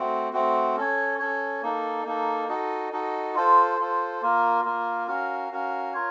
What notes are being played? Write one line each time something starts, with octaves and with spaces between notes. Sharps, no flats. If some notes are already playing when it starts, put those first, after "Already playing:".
Already playing: A3 C4 F#4
A3 C4 F#4
C#4 A4 C#5
C#4 A4 C#5
A#3 D#4 A4
A#3 D#4 A4
D#4 F#4 A4 D#5
D#4 F#4 A4 D#5
F4 A4 C5
F4 A4 C5
A#3 F4 A#4
A#3 F4 A#4
C#4 F#4 A#4 F5
C#4 F#4 A#4 F5
F4 A#4 C#5